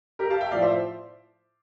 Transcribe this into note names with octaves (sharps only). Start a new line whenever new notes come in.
G4 A#4
F5 A5
E5 G5
A2 F3 D5 F5
C5 E5